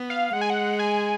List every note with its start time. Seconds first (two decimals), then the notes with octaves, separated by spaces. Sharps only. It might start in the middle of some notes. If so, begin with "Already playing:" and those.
Already playing: B3
0.10 F5
0.33 G#3 F#5
0.41 G#5
0.50 F#5
0.79 G#5